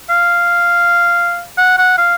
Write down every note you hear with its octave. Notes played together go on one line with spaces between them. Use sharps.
F5
F#5
F#5
F5